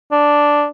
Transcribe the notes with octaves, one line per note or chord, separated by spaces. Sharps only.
D4